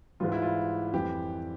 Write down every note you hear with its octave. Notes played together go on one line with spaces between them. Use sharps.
G#2 E3 G3 F4
E4
F4
F2 E3 G3 G4